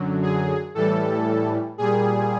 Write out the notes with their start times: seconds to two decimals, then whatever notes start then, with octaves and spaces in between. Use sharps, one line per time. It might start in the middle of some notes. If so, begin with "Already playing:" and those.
Already playing: F#2 D3 F#3
0.22 G#4
0.74 A2 E3 G3 A4
1.78 A#2 G3 G#4